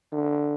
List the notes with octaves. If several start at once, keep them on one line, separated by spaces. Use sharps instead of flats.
D3